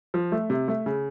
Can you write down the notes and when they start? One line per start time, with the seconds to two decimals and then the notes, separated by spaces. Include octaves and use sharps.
0.14 F3
0.32 A3
0.50 C3
0.68 A3
0.86 C#3